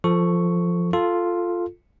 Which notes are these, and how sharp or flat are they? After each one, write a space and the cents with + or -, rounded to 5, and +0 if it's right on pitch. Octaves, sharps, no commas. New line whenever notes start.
F3 -5 A4 +5 C#6 +0
F4 +0 A4 +0